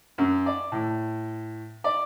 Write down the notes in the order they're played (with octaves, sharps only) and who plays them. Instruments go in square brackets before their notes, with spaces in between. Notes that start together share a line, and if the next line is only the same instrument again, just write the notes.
[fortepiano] F#2
D5
A2
D5